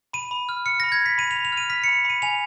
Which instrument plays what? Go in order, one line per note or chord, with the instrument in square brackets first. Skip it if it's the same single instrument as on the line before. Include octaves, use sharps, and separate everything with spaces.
[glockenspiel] B5 D#7
B5
F6
F6 C#7
B5 A#6
G#6
B5 B6
B5 D#7
F7
B5
F7
F6
D#7
F6 B6
B5 C#7
B5 D#7
G#5 F7